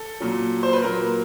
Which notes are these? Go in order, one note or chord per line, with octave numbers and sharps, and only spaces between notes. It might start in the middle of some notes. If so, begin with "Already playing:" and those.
Already playing: A4
A#2 F#3
C5
B4
A#2 F#3 A#4